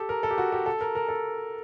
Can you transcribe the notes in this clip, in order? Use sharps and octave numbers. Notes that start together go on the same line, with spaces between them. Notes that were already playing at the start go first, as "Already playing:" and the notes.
Already playing: G4 A4
A#4
A4
G4
F#4
G4
A4
A#4
A#4
A4